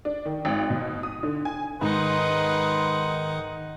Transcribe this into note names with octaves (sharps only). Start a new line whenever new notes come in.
D4
D#3
G#1
B2
D#6
D3
G#5
G#2 D#3 D#4 B4 F#5 C6